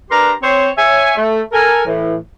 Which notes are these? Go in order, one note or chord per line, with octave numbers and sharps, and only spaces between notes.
D4 G4 A#4 B4 A#5 C6
C4 C5 C#5
C#5 E5 G#5
A3
A4 A#4 G#5
A2 E3